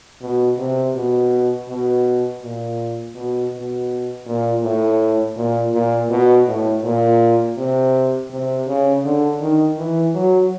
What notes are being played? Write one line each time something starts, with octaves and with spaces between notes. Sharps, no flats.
B2
C3
B2
B2
A#2
B2
B2
A#2
A2
A#2
A#2
B2
A2
A#2
C3
C3
C#3
D3
D#3
E3
F#3